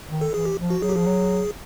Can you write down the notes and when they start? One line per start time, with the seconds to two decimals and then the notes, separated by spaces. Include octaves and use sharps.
0.09 D#3
0.21 A4
0.34 E3 G#4
0.45 G4
0.58 F3
0.70 F#4
0.82 F#3 G#4
0.89 G4
0.95 F3 G#4
1.07 F#3